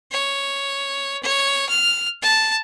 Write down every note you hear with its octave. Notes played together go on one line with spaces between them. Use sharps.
C#5
C#5
F6
A5